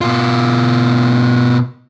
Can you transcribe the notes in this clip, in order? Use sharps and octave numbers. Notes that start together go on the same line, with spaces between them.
B2 F4